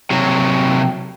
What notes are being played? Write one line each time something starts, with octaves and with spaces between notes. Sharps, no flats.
C3 F#3